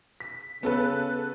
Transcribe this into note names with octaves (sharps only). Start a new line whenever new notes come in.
B6
C#3 B3 C#4 A4 B4